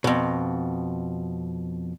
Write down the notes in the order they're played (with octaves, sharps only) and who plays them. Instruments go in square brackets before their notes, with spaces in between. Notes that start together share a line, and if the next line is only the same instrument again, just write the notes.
[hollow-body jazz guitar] F2 B2